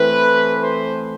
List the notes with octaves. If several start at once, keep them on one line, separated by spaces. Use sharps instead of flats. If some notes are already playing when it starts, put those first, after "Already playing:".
Already playing: E3 A3 C4 B4
C5